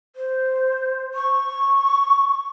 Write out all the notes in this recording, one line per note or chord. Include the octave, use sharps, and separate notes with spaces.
C5
C#6